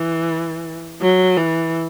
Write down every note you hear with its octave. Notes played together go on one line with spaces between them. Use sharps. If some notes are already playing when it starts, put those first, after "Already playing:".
Already playing: E3
F#3
E3